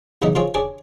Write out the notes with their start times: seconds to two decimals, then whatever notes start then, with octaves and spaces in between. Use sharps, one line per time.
0.22 B1 C#3 E3 B3 D#4 D#5
0.35 D#3 F3 C4 F4 G#4 C#5
0.54 C#4 D4 G#4 D5 G#5